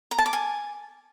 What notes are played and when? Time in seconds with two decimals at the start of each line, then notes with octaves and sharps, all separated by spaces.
0.11 A#5
0.18 A5
0.26 D6
0.33 G#5